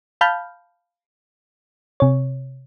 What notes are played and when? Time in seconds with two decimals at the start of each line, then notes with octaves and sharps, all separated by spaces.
0.21 F5 A5 B5 F6 G6
2.00 C3 C#5